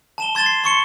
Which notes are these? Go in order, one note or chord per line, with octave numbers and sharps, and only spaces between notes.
A5 E7 G7
C6 G#6 A6 E7 G7
C7
C6 C#6 C#7 G7